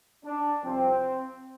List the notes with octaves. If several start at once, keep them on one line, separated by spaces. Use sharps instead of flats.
D4
C2 C3 F3 C4